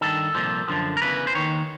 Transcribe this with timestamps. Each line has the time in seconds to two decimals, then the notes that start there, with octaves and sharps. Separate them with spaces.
0.01 G2 D#3 A4
0.35 C2 A#2 F3
0.68 F#2 D3 F3
0.97 A#4
1.02 E2 C#3 E3 B4
1.27 C5
1.35 D#2 D#3 C#5